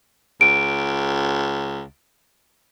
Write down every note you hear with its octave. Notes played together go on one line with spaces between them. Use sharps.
C#2 D7